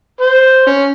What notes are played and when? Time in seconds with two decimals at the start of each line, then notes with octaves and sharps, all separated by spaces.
0.21 C5
0.67 C#4